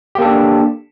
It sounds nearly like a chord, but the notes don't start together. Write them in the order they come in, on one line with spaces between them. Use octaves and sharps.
G4 A#3 A4 D4